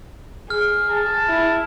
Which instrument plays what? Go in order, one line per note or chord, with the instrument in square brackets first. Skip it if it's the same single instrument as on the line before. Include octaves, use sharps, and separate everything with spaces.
[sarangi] G#4 [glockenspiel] F6
[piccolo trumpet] A5
[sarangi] E4